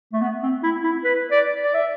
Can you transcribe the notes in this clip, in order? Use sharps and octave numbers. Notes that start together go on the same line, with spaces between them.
A3
B3
C4
E4
E4
B4
D5
D5
E5